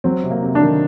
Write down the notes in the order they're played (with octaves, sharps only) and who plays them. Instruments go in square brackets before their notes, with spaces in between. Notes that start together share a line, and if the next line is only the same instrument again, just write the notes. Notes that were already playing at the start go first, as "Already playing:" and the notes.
[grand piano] F#3 [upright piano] C4
[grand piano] C3
[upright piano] A#3
[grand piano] C3
[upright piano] D4
[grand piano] D#3